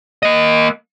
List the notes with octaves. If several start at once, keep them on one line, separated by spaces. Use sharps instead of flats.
A#3 D#5